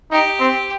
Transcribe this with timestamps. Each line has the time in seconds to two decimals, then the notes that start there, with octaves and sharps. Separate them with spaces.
0.11 D#4 G4
0.40 C4